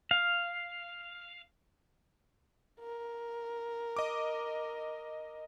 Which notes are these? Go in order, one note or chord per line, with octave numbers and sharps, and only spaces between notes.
F5
A#4
D#5 D6